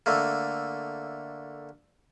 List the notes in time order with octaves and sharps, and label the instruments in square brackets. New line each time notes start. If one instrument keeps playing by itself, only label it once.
[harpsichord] D3 A3 A#3